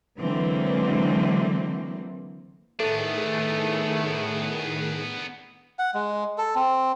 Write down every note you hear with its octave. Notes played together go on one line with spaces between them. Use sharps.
D3 E3 F#3 G#3 A#3 C4
A2 D#3 A3 B3 D4 G#4 A4
F#5
G#3
A4
C4